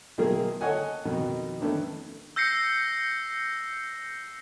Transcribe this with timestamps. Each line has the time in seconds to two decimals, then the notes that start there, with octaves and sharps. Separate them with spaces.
0.18 B1 D#3 A3 A#3 G#4 A#4
0.61 A4 C#5 D#5 F#5 G#5
1.05 F2 B2 D#3
1.61 D#3 A3 B3 C#4 D4
2.36 E6 G6 A#6 C7 C#7